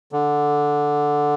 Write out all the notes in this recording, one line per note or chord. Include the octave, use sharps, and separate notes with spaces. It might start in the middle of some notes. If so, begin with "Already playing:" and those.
D3